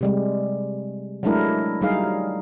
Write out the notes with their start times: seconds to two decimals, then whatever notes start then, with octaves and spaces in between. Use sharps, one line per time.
0.01 C3 G3 G#3
1.23 F#3 G#3 A3 D4 E4 A#4
1.81 F#3 G3 D#4 G#4 F5